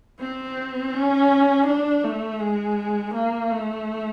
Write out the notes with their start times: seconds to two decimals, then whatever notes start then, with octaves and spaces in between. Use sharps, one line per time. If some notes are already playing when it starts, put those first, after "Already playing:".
0.20 C4
0.93 C#4
1.67 D4
2.04 A3
2.41 G#3
3.15 A#3
3.52 A3